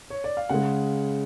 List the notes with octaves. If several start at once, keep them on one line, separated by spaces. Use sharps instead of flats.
C#5
D5
F5
C#3 G#3 F#5